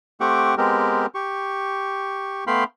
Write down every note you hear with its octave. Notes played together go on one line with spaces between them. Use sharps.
A3 C4 G4 F#5 C#6 D6
G#3 B3 C4 G4 A#4
G4 C#6
A3 B3 F5 G5 B5 C6